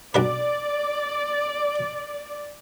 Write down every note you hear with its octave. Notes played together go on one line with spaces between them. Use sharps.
B1 D4 B4 D5